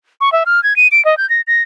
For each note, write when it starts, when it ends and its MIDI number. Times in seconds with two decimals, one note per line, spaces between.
0.21 0.32 85
0.32 0.43 76
0.46 0.63 89
0.63 0.76 92
0.76 0.88 99
0.92 1.04 98
1.05 1.17 75
1.17 1.28 91
1.29 1.41 94
1.47 1.62 94